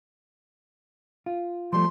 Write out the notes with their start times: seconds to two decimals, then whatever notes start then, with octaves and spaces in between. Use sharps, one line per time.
1.26 F4
1.73 F3 G3 A3 C6